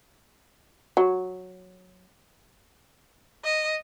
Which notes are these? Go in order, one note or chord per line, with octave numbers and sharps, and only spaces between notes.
F#3
D#5